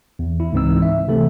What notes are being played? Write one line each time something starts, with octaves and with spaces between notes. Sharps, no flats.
E2
E4
C#2 G#2 E3 C4 D#4 E6
E5
C3 E3 A3 C4 A4